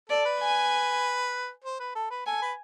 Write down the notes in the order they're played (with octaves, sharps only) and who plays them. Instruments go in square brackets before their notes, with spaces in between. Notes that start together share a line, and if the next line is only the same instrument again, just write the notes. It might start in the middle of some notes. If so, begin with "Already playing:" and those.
[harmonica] A4 [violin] D5
[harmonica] B4
[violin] G#5
[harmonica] C5
B4
A4
B4
[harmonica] A4 [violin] G#5
[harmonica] B4